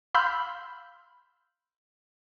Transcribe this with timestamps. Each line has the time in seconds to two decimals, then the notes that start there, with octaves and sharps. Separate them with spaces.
0.14 F5 B5 C6 E6 F6 G6